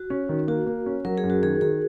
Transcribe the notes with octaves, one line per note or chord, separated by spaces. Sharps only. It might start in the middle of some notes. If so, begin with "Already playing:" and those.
Already playing: F#4
C#4
D#3
A#3 F#4
A#3
C#4
F#3 A#4
G#4
F#2
F#4
D#3 G#4
D#3 G#4